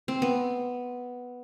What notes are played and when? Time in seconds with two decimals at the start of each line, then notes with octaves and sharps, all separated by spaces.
0.08 C4
0.22 B3